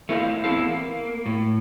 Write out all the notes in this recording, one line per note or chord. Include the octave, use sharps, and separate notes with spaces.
A3 A#3 E4 C5 D#5 F5
E2 B3 C4 E4 A4 F5
A#3
A2